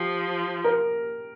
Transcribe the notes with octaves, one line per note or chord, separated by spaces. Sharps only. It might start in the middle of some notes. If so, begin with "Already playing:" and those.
Already playing: F3 G4
A#4